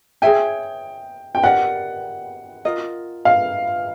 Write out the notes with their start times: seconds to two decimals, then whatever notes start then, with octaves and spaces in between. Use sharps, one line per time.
0.22 G#4 C#5 E5 G5 G#5
1.35 G5
1.43 G4 A#4 D5 F#5
2.65 F4 A#4 D#5
3.25 F5